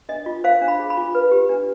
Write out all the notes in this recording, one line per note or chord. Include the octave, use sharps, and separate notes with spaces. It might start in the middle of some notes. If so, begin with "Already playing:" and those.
D4 D#5
F4
C5 F5
D4
B5
G#4
B5
F4
B4
G4
D4